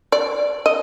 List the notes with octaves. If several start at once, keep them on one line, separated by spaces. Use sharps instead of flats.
D5
D#5